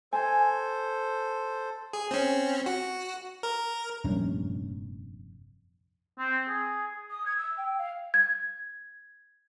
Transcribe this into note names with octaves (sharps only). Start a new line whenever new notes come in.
A4 C5 G#5
G#4
C4 C#4
F#4
A#4
F1 A#1 G2 C#4
C4
G#4
D#6
G#6
E6
G5
F5
G#6